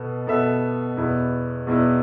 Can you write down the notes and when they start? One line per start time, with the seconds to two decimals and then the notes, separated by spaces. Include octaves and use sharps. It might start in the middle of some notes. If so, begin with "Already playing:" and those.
Already playing: B2 B3 A4
0.27 B2 B3 A4 E5
0.97 E2 B2 B3 E4
1.67 E2 B2 B3 E4